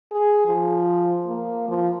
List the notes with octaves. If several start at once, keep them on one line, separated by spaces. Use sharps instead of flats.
G#4
F3
A#3
F3